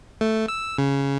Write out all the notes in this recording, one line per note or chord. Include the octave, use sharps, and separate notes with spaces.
A3
E6
C#3